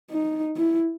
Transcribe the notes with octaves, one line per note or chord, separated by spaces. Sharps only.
D#4
E4